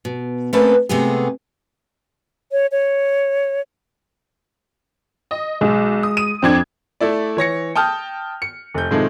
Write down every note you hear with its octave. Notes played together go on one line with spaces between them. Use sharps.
B2
A3 A#3 C4 C#4 A4 B4
C3 G#3 A3 B3 G#4
C#5
C#5
D#5
B1 G#3
D#6
D#7
F2 C4 D4 G#6
A3 E4 D5
E3 C#5 A#6 C#7
G5 A5 D#6 F6 G6
C#7
F1 G6
A2 C3 D#3 F3 G#3 A3